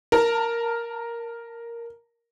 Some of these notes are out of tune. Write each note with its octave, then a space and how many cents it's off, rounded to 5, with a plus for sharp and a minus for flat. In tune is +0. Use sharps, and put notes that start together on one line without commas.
A#4 +0 A5 +30